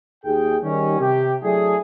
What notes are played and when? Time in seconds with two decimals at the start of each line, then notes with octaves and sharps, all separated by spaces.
0.24 D#2 G#4 G5
0.63 D#3 G3 C#4
1.00 C3 G4
1.43 F#3 A3 D4 E4 G#4